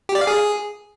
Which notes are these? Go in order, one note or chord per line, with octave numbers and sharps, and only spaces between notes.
G4
D5
F5
G#4